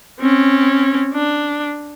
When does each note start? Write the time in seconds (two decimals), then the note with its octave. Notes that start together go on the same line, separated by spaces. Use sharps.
0.20 C4 C#4
1.14 D4